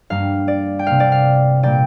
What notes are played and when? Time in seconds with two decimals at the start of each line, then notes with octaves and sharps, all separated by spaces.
0.10 G2 G3 A#3 F5
0.48 D5
0.79 G5
0.86 C3 A#3 F5
1.00 D5
1.12 F5
1.63 A#2 G3 A#3 D5 G5